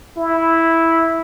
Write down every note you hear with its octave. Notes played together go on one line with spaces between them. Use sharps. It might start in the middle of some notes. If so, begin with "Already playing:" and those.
E4